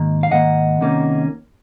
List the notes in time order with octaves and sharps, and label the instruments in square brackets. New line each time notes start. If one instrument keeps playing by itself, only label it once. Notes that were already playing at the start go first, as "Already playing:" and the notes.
Already playing: [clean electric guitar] G#2 D#3 A#3
F5
G#2 D#3 A#3 D#5 F#5
C2 C3 D#3 A#3 C#4